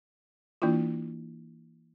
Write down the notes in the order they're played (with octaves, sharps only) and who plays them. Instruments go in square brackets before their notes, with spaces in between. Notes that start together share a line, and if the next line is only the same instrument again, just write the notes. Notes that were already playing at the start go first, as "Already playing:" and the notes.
[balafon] E3 A#3 D4 E4 F4